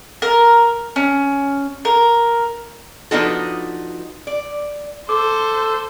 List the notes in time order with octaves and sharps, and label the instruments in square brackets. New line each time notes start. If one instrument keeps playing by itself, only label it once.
[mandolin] A#4
C#4
A#4
[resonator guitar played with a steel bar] F3 B3 D4 D#4 F#4 A4
D5
[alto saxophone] A4 [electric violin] C5 [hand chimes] D6